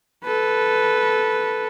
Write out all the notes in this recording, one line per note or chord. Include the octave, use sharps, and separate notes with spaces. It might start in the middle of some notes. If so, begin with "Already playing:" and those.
A4 B4